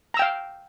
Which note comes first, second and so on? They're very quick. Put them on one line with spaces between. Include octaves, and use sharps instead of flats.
A#5 E6 G5 F5